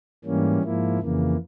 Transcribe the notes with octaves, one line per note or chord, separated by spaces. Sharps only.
G#2 E3 G3 A#3 C#4
G#2 F3 A#3 E4
F2 C#3 E3 A#3